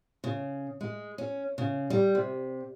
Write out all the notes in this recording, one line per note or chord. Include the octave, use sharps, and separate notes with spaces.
C#3
G#3
C#4
C#3
G3
C3